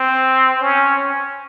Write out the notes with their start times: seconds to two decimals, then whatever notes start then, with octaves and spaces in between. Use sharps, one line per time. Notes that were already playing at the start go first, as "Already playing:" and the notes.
Already playing: C4
0.61 C#4